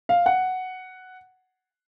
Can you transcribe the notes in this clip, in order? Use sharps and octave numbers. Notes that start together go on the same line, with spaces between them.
F5
F#5